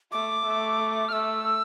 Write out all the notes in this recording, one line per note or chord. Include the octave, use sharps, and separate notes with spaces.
A3 D6
A3
F6
A3 E6